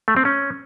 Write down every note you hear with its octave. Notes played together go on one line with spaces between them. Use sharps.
A3
C4
C#4